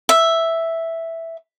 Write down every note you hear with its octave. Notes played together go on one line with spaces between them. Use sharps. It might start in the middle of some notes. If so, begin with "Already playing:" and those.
E5